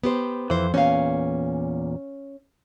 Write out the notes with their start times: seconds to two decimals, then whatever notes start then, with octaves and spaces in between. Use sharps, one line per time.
0.03 B3 G4 C5
0.50 F2 E3 C5
0.74 E2 A#2 C#4 F5